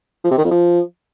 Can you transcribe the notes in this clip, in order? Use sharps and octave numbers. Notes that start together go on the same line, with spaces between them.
F3
C3
D#3
F2
F3